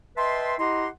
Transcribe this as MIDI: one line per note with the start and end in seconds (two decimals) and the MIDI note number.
0.17 0.54 71
0.17 0.54 75
0.17 0.54 76
0.17 0.54 79
0.17 0.54 81
0.17 0.54 84
0.59 0.87 64
0.59 0.87 67
0.59 0.87 75
0.59 0.87 78
0.59 0.87 82
0.59 0.87 84